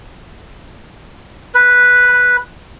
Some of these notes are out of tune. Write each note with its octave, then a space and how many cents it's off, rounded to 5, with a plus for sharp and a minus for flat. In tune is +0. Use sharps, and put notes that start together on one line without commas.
B4 -5